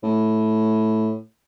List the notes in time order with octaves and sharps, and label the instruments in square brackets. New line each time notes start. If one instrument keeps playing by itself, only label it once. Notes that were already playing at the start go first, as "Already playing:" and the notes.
[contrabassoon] A2